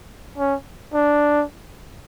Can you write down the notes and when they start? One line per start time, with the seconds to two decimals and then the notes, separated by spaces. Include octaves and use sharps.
0.38 C#4
0.94 D4